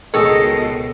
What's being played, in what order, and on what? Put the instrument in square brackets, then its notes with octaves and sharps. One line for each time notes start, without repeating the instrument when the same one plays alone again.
[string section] C#2 B2 [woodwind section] D#3 D#5 [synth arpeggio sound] G#4 [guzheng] A4 C#5